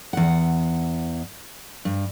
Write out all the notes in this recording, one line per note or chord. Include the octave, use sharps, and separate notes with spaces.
E2 F#5
G2